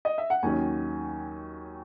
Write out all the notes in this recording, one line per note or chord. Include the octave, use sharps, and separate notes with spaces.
D#5
E5
F#5
D#2 D#3 F#3 C#4 G#5